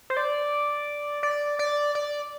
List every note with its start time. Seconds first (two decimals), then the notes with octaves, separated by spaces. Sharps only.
0.10 C5
0.17 D5
1.23 D5
1.59 D5
1.95 D5